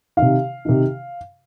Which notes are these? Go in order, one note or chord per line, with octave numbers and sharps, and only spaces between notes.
C3 D#3 F5
C3 D#3